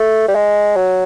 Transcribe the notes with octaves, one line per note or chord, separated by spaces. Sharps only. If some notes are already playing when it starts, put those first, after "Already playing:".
Already playing: A3
G3
G#3
F#3